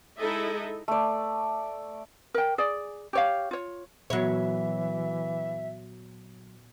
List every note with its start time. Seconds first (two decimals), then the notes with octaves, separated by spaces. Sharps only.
0.18 G#3 D#4 E4 A4 D#5 E5
0.88 A3 D5
2.34 A#4 G5
2.58 G#4 D5
3.13 G4 C#5 F5
3.51 F4 C#5
4.10 A#2 E3 F#3 B3 F#4 C#5 E5